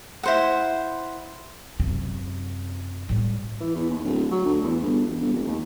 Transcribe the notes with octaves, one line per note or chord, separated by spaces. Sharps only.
E4 C5 F#5
F#2 C3
A2 G3
E3
E2
D#2
D1
F#3
D2
E2
G1
E1
G1
F1
D#2